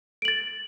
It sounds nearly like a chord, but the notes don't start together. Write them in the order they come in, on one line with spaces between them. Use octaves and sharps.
D7 F#7 A6